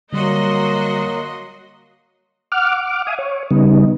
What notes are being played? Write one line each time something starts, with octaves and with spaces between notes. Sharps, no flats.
D3 F#3 G3 A#3 F#4 D#5 C6
F#5 D6 F6
E5 F5 G#5 D#6
C#5
C#3 G3 B3 D#4